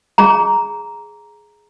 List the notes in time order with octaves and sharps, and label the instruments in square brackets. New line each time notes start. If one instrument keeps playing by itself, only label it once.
[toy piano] G#4 A#5